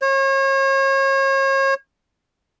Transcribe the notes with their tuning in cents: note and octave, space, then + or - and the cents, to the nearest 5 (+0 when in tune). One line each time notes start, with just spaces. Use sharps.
C#5 -35